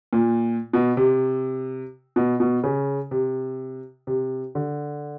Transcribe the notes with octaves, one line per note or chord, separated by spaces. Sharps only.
A#2
B2
C3
B2
B2
C#3
C3
C3
D3